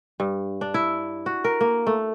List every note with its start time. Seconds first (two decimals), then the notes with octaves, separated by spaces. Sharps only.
0.20 G2
0.61 D4
0.74 E4
1.26 F#4
1.44 A#4
1.61 A#3
1.87 A3